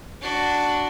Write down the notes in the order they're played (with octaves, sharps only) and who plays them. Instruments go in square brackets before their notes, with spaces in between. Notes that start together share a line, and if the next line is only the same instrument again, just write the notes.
[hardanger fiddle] D4 F#4